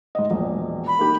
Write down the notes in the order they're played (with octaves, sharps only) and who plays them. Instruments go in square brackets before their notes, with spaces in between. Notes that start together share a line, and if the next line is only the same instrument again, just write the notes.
[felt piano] G#2 D#5
E1 A#1
[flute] B5
[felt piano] A#3 D#4 G4